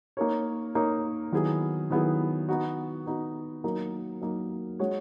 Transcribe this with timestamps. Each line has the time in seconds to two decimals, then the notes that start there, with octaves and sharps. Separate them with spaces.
0.17 A#3 D#4 A#4 C#5
0.75 A#3 D#4 A#4 C#5
1.32 D#3 F#3 B3 E4 G#4
1.90 D#3 F#3 B3 E4 G#4
2.49 B3 D#4 F#4
3.06 B3 D#4 F#4
3.64 F#3 A#3 D#4 A#4
4.22 F#3 A#3 D#4 A#4
4.79 G#3 C#4 F#4 C#5